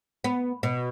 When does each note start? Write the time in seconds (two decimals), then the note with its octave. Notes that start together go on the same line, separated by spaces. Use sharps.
0.24 B3
0.63 B2